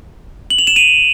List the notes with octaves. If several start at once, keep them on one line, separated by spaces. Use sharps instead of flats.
F#7
F7
E7
D#7 F7